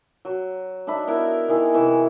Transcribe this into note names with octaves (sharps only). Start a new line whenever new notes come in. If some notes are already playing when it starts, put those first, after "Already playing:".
F#3
D4 D#4 E5 B5
B3 E4 A#4
D#3 E4 G#4
C3 E3 C#6